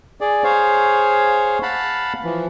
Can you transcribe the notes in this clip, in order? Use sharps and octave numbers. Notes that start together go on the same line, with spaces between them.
G#4 D5
G#4 C5 C#5 F5
F5 F#5 A5 B5
E3 F3